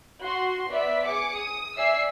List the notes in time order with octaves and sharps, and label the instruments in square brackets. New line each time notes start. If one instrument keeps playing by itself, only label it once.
[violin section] F#4 C6
B3 D5 E5 B6
G#4 D6 C#7
D#6
D5 E5 G#5 E6 C7